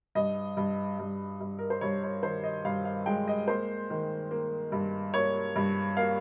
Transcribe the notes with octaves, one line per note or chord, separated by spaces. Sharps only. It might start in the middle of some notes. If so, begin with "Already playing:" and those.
G2 D#5
G2
G2
G2
A#4
C5
G2 C#5
C#5
D#3 C5
D#5
G2 F5
F5
G#3 G5
D#5
A#3 C5
D#3
A#3
G2
A#3 C#5
G2
A#3 F5